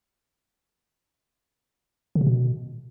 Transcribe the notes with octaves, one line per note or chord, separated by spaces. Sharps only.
D3
C3
B2